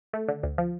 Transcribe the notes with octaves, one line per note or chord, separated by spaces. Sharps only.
A3
D3
D2
F3